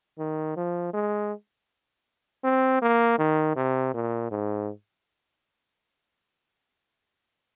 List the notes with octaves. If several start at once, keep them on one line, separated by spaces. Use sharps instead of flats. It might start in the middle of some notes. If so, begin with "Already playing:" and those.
D#3
F3
G#3
C4
A#3
D#3
C3
A#2
G#2